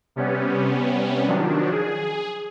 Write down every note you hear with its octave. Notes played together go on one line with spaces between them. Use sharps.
C3 G3 B3 C#4
D#3 F3 F#3 D4
G#4